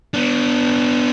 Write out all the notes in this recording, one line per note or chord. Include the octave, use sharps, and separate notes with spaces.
B3 D4